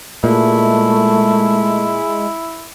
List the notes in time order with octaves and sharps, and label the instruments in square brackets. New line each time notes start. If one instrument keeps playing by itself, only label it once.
[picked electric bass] A#2 [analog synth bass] G#3 [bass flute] A3 [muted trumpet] E4